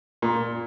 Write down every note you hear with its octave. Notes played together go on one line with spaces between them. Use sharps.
A#2